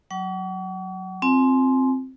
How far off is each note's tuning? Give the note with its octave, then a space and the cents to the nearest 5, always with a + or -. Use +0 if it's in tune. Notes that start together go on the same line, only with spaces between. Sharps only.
F#3 +0 F#5 +35 C#6 +45
C4 +0 F4 +0 G#5 +35